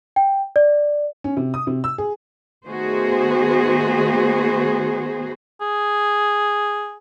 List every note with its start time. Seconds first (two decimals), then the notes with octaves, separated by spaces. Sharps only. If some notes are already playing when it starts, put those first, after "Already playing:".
0.16 G5
0.56 D5
1.24 C#4
1.37 C3
1.54 D#6
1.67 C3
1.84 E6
1.98 G#4
2.67 D#3 A3 B3 F#4 G#4 C5
5.61 G#4